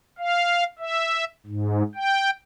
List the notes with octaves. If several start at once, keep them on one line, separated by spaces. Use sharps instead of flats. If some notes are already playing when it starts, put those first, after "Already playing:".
F5
E5
G#2
G5